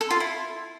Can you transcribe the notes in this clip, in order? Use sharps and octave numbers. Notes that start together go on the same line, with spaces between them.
A4
F4
E4